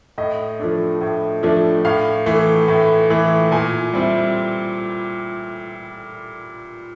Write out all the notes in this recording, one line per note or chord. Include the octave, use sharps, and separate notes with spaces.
A2 D#5
F3 A3 D4
A2
F3 A3 D4
A2 F5
E3 A3
A2
E3 A3
A#2 G#5
G3 C4 E4